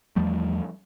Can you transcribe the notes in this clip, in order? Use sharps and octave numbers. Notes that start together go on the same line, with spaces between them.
E2 F3 G3 A3